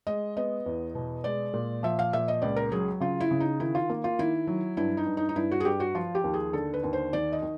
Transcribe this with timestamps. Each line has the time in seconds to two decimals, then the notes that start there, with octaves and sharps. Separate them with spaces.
0.07 G#3 D#5
0.37 B3 D#5
0.66 E2
0.95 B2
1.24 G#3 D5
1.54 A#2
1.83 F3 E5
1.99 F5
2.13 A#2 E5
2.28 D#5
2.42 C#2 D5
2.56 A#4
2.72 F#3 G#4
3.00 C#3 F4
3.20 E4
3.31 C#3
3.40 D#4
3.60 D#3 E4
3.75 F4
3.89 A#3
4.04 F4
4.19 D#3 E4
4.47 F#3
4.77 G2 E4
4.97 D#4
5.06 G2
5.17 D#4
5.29 D#4
5.36 G2 E4
5.51 F#4
5.60 G#4
5.65 G2 G4
5.80 F#4
5.95 F3 F4
6.15 G4
6.24 D#2
6.34 G#4
6.53 D3 A4
6.74 B4
6.84 D#2
6.93 C5
7.13 D#3 D5
7.32 D#5
7.42 D#3